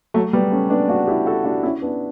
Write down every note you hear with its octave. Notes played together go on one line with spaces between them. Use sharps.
F#3 A3
G3 B3
A3 C#4
B3 D4
D4 F#4
E4 G4
F#4 A4
D4 F#4
C#4 E4
B3 D4